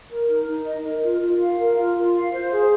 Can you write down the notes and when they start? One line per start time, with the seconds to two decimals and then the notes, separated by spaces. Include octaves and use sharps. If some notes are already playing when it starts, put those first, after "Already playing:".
0.09 A#4
0.28 D#4
0.47 D#4
0.65 D#5
0.84 A#4
1.03 F4
1.21 F4
1.39 F5
1.58 A#4
1.76 F4
1.96 F4
2.14 F5
2.32 C5
2.51 G#4